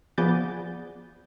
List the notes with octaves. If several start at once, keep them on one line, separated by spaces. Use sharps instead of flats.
F3 B3 G#4 D5 G6 A6